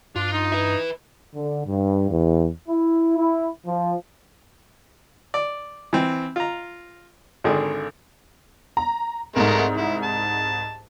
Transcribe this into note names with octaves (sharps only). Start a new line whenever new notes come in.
G2 D4 F4
D#4
B4 E5
D3
G2
E2
E4
E4
F3
D5
E3 C4
F4 A#5
G#1 D3 D#3 G#4
A#5
C2 G#2 G#3 A3 A#4
E4
A5